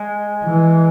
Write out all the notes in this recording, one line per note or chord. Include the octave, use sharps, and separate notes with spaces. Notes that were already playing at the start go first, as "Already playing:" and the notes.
Already playing: G#3
E3